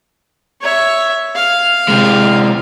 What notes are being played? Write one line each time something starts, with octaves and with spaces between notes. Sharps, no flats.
C#5 E5
F5
C3 G#3